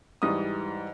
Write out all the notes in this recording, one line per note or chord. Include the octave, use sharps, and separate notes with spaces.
G#2 E3 G3 D#6